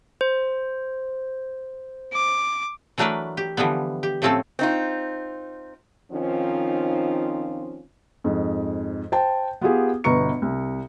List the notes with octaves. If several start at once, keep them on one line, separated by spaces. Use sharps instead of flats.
C5
D6
E3 F#3 A3 D4 A#4 B4
G4
D3 E3 F3 G3 B3
G4
A2 F3 A3 C4 C#4 A4
C4 D#4 F4
D#3 F3 C4 C#4 D#4 F4
F2 G#2
C5 G5 A5
B3 F4 G4 G#4
G1 B2 B4 A#5 C#6 C#7
C2